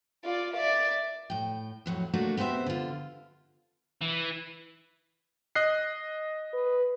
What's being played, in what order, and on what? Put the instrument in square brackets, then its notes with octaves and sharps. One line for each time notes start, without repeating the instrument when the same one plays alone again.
[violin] F4 D5
D5 E5
[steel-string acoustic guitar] A2 G5
F2 A2 F#3
A3 A#3 D4 D#4 F4 F#4
B3 C4 G4 C5 E5
D3 F4
[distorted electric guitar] E3
[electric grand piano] D#5 F#6 C7
[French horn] B4